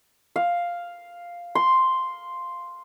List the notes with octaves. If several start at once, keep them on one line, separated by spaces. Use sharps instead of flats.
F5
C6